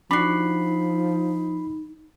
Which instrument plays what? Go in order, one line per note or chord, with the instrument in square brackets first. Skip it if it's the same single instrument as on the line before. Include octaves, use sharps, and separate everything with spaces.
[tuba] F3 [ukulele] D4 F#4 [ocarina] D#4 [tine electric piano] B5 C7